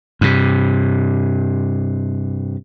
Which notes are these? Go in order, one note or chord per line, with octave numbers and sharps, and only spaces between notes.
G2 C3